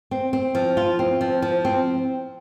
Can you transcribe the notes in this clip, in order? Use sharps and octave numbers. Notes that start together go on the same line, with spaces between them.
C4
C4
F3
F4
C4
F3
F3
C4